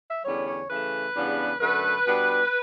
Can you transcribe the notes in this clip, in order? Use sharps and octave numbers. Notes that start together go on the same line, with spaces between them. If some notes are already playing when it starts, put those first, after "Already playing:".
E5
E2 D3 G3 C#4 C#5
C#5
C#3 E3 A3 B4
E2 C#3 G3 B3 D4
F#2 D3 A3 B4
B2 G3 B3 D4